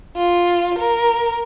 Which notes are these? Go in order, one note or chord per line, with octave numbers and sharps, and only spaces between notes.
F4
A#4